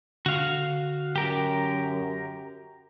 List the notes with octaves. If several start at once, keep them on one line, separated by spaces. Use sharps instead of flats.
D3 F#4 F5
F#2 G4 A#4